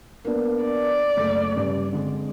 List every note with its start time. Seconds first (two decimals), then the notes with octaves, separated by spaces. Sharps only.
0.25 A#3 B3 D4
0.64 D5
1.17 F#1 A3
1.56 G2 C#3
1.93 D3 G#3 C4